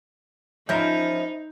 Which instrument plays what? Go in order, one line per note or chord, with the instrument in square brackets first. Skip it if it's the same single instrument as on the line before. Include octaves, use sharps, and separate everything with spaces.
[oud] F3 C#4 A#4 [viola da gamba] D#4 [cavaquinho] E4 [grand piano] G6